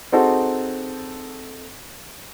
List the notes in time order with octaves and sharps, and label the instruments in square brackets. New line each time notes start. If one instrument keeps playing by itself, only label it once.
[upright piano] C4 D#4 F#4 G#4 A4 C5